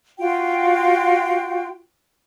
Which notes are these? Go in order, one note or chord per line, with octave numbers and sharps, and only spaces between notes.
F4 F#4 G5